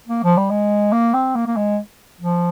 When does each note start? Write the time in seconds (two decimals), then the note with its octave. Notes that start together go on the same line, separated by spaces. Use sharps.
0.08 A#3
0.24 F3
0.37 G3
0.50 G#3
0.92 A#3
1.14 C4
1.36 A#3
1.47 A#3
1.56 G#3
2.21 F3